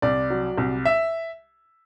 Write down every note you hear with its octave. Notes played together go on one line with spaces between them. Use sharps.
C2 D5
F#3
C2
E5